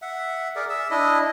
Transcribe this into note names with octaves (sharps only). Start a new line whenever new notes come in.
E5 F#5
G#4 A#4 D5
E5 E6
D4 E4 D#5